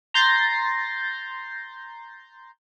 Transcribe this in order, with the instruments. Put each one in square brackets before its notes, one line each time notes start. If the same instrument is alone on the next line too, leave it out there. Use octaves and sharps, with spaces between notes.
[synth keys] A#5 C6 G6 A6 A#6 C7